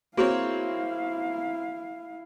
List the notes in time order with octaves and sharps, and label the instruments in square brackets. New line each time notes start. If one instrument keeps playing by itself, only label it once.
[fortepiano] A#3 C4 C#5 [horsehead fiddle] E4 F5 [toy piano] F#4 G#4